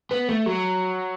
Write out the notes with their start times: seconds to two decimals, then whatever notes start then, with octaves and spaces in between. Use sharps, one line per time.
0.11 B3
0.29 A3
0.46 F#3